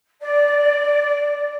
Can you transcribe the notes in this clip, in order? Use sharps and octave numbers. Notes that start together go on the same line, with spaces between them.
D5